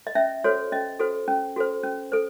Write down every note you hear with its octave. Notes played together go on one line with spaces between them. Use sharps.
D#5
C#4 E5
F#4 A4 C5 C#5
C#4 D#5
F#4 A4 C5
C#4
F#4 A4 C5
C#4
A4 C5